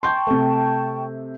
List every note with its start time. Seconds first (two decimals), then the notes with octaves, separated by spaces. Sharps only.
0.03 G5 A5 C6 C#6 G6
0.27 C3 A3